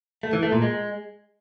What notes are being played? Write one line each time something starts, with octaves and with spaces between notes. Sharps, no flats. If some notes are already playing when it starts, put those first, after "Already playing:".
A3
E3
A3
A#2
G#3